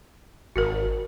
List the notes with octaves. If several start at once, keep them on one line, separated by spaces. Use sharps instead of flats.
G#1 F#4 A#4